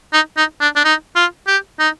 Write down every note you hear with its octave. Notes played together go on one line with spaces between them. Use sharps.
D#4
D#4
D4
D4
D#4
F4
G4
D#4